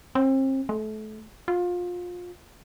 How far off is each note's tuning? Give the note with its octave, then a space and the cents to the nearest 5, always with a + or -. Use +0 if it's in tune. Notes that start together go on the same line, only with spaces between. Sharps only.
C4 +35
A3 -30
F4 +25